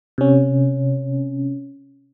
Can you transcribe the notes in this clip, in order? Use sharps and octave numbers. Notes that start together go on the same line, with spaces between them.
C3 C#4